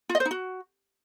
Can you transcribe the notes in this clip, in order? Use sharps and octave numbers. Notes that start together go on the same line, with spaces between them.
F4
D#5
C5
D#4
F#4